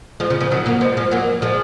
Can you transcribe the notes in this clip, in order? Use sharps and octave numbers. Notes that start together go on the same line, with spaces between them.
F3 G#3
C#3 F3
C#3 F3
D#3 F#3
F#3 A#3
F3 G#3
F3 G#3
F#3 A#3
F3 G#3